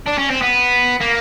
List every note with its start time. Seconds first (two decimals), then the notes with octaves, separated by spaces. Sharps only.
0.06 D4
0.18 C#4
0.30 C4
0.42 B3
1.01 A#3